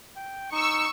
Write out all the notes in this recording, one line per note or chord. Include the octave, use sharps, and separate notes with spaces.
G5
D#4 C#6 E6